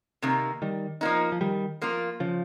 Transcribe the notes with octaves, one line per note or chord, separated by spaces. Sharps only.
C3 D#3 A#3
D#3 G3
F3 A#3 D#4
F3
D#3 G3
F3 A#3 F4
C#3 F3